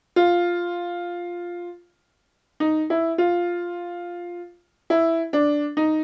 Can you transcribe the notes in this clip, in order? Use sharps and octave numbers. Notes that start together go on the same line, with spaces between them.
F4
D#4
E4
F4
E4
D4
D#4